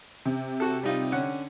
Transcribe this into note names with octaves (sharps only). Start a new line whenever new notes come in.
C3
F#4 A4
G3 D#4 F4
D3 C#4 F#5